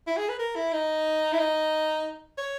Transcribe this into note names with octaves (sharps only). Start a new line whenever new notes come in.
E4
G#4
B4
A#4
E4
D#4
E4
D#4
C#5